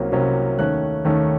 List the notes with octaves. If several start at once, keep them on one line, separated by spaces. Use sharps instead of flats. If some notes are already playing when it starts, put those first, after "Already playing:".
Already playing: C2 C3 F#3 A#3 C#4
C2 C3 F#3 A#3 C#4
D#2 D#3 A3 C#4 F#6
D#2 D#3 A3 C#4